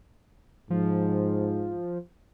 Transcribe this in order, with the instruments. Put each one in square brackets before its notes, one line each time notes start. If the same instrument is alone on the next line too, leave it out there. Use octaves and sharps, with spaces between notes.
[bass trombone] G#2 [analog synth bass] F3